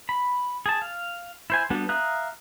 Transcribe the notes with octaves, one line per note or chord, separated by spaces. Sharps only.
B5
G#4 A5
F5
E4 C5 G#5
G3 B3 D4 F#4 A4
E5 F5 A#5 D#6 F#6